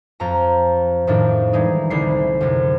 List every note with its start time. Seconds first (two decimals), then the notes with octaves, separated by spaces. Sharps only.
0.20 F2 A#5
1.07 F2 A2 D#3 D4
1.53 E3 G3 G#3 D#4
1.90 C2 D3 D#3 E4 C7
2.41 F#2 C3